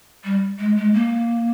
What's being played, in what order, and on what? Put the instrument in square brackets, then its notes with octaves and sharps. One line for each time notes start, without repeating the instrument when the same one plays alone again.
[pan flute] G3
G#3
G#3
A#3